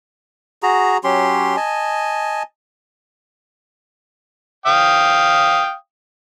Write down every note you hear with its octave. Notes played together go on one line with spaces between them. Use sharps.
F#4 G#4 A#5
F#3 C#4 G4 C6
D#5 G#5 A5
F5 G5 D#6